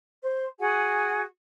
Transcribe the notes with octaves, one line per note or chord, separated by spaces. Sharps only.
C5
F#4 G#4 F#5 G#5